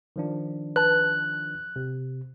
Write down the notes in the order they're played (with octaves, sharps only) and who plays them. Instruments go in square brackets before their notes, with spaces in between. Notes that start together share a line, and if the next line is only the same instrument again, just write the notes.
[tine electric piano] D#3 F3 D4
[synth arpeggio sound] B4 A5 [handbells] F#6
[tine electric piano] C3